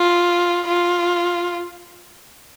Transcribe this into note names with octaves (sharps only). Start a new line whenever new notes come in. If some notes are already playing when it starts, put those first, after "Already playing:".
Already playing: F4
F4